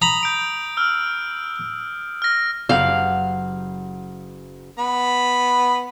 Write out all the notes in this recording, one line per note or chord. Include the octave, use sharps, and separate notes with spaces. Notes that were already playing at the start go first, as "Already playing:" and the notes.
A#5 B5 D#6
G6 D7
E6 F6
F6 A#6
F#1 G4 F5 F#5
B3 B5